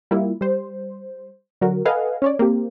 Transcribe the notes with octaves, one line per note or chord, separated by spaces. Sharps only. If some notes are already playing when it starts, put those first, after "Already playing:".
G3 A#3 E4 F4
G3 C5
D3 F#3 F#4 A#4
A4 B4 D#5 F5 F#5 G#5
C#4 C#5 D5
A#3 C4 G4